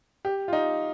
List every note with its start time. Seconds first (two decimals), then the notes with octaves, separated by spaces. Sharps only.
0.25 G4
0.48 F4
0.53 D#4